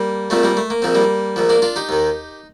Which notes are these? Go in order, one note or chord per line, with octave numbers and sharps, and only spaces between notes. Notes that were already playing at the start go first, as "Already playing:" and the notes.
Already playing: G3 A#3
A#1 A#2 F3 A3 C4
G3 A#3
A3
A#3
A#1 A#2 F3 C4
G3 A#3
A#1 A#2 F3
A#3 D4
D4 F4
D#4 G4
D#2 D#3